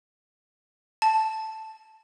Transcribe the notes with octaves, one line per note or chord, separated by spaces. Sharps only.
A5